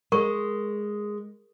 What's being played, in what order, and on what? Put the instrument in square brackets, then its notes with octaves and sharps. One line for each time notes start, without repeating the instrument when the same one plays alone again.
[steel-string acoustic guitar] G#3 [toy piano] A#4 C#6